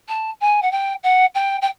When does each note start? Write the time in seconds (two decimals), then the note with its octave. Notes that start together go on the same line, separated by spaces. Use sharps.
0.08 A5
0.41 G#5
0.62 F#5
0.72 G5
1.03 F#5
1.35 G5
1.62 G5